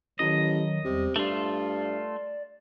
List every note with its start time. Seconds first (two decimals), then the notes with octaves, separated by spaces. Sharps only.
0.19 A1 D#3 F#3 D#5
0.84 E2 C3 G3
1.16 G2 A3 F4 D5